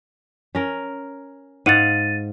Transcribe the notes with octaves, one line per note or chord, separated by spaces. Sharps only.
C#4 A#4
G#2 F5 F#5 A6 D#7